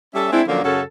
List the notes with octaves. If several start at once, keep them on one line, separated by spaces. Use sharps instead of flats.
G3 C#4 A4 E5
G#3 C4 D4 E4
D3 F3 F#3 A#3 C#4 D4
F#2 C#3 C#4 F#4 A4